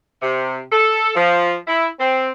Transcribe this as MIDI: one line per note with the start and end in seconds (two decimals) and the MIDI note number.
0.22 0.60 48
0.72 1.10 69
1.15 1.56 53
1.67 1.87 64
1.99 2.30 60